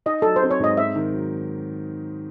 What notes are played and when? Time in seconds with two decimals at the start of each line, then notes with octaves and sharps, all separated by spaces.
0.06 D#4 D#5
0.22 F#3 A4
0.36 C5
0.42 C4
0.51 C#5
0.60 G#2 D#5
0.77 C4 E5
0.95 D#3
1.14 F#3